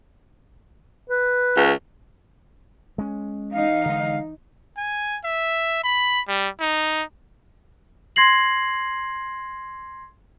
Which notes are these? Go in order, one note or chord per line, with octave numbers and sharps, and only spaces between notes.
B4
C#2
G#3 C#4
E3 D#4 F5
D3 G#3
G#5
E5
B5
G3
D#4
C6 G#6 A#6 C7 F#7